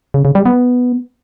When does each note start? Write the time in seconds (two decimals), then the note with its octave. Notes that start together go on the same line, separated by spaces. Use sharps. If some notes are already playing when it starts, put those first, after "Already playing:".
0.14 C#3
0.25 C#3
0.35 G3
0.46 B3